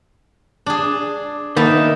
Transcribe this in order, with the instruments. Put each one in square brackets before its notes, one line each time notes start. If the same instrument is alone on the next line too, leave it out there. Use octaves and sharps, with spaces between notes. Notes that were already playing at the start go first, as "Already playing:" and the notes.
[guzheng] D4 G#4
[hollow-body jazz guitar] D#3 A#3 B3 [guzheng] D#4 E5 A5